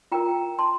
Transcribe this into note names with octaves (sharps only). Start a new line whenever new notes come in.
F4 A#4 G5 A#5
A5 C6